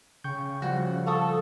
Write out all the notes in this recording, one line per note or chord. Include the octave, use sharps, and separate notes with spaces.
C#3 G5 C#6 G6
F3 G3 F4 F#4
A4 F5 C#6 D#6